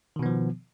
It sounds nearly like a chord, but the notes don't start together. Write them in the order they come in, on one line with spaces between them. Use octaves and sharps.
D#3 B2 B3 F3